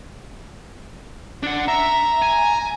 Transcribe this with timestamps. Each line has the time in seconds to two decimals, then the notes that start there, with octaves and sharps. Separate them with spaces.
1.43 D4 F#5
1.68 E5 A#5
2.22 G#5